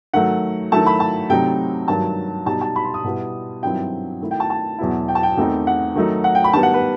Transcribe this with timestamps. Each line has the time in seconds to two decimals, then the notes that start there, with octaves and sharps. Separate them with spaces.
0.14 D#3 F#3 A3 F#5
0.72 D#3 F#3 A3 E4 A5
0.86 B5
1.00 A5
1.29 C3 F#3 A3 C4 D#4 G5
1.87 G2 D#3 F#3 A5
2.46 B2 G3 D#4 A5
2.61 A5
2.76 B5
2.84 C6
2.94 D#6
3.04 B2 G3 B3 E4
3.63 G2 D#3 F#3 C4 E4 G5
4.21 D#3 A3 E4
4.31 G5
4.40 A5
4.50 A5
4.79 E2 B2 F#3 B3 E4
5.08 G5
5.15 A5
5.23 G5
5.37 E2 D#3 A3 C4 D#4
5.67 F#5
5.95 D#3 F#3 A3 D#4
6.24 F#5
6.35 G5
6.44 B5
6.53 D#3 G3 B3 A5
6.63 F#5
6.74 B4